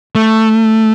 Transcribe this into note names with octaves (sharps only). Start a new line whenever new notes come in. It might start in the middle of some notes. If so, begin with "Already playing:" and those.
A3